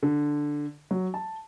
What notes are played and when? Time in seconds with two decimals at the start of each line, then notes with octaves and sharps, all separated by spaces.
0.03 D3
0.91 F#3
1.14 A5